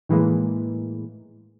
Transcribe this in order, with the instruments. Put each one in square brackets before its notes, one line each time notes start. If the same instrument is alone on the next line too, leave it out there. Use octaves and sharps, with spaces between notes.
[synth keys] A2 E3 G#3 A#3